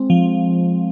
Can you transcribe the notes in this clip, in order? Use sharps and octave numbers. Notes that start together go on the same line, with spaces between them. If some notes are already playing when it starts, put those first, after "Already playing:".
Already playing: G#3 C4
F3